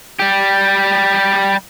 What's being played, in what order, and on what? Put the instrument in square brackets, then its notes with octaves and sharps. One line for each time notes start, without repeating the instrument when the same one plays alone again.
[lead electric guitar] G3 G4